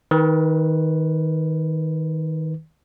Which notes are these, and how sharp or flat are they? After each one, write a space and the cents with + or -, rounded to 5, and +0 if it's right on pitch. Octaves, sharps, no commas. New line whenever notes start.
D#3 +20 B4 +0